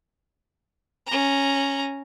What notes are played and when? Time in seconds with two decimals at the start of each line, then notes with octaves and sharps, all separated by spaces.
1.07 C#4 A#5